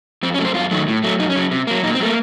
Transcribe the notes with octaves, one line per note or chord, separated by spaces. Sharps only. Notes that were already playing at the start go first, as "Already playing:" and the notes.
F2 C4
C#4
C3 F#3 A3
C5
F#2 F4
D#3 F#3 A3
A2
F#3 A3
F#2 D#4
C#4
C#3 F#3
C3
F#3 A#3
A#2 D#4
C4
F#3 A3 A#3